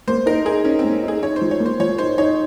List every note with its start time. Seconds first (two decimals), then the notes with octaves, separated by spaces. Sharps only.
0.07 A#3 C5
0.26 D#4 A#4
0.45 D#4 G#4
0.64 C#4 D#4
0.79 C4
0.84 A#3
1.03 D#4 G#4
1.22 D#4 C#5
1.36 C5
1.41 F3
1.51 C#5
1.60 A#3
1.66 C5
1.80 F3 C#5
1.98 D#4 C5
2.18 D#4 C#5